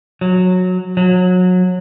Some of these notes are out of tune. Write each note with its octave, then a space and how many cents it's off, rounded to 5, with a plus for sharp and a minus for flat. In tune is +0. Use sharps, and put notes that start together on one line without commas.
F#3 -15
F#3 -25